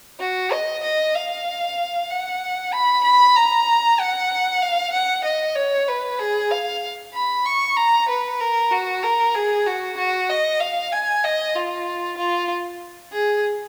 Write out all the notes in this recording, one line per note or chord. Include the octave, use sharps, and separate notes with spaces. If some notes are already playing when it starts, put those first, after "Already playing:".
F#4
D#5
D#5
F5
F#5
B5
B5
A#5
F#5
F5
F#5
D#5
C#5
B4
G#4
F5
B5
C#6
A#5
B4
A#4
F#4
A#4
G#4
F#4
F#4
D#5
F5
G#5
D#5
F4
F4
G#4